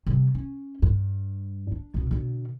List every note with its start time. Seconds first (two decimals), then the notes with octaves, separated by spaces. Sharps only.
0.06 C3 G3
0.35 C#4
0.82 G2
1.72 D4
1.94 C#2 B2
2.11 B2 D3